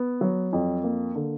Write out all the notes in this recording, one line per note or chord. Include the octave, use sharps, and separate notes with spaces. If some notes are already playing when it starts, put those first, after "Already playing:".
Already playing: B3
F#3
F2
A#3
D3